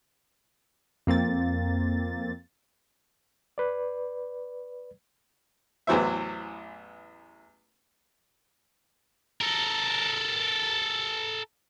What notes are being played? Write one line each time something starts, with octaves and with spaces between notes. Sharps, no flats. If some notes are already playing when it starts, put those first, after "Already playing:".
F2 A#3 C4 A6
B4 D5
A1 E2 E3 F#3 C5 E5
A4 A#4